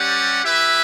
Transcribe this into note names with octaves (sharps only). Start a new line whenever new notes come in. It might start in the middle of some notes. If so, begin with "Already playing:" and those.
Already playing: G3 C#4 G4 D5 F#5
E4 G4 B4 E5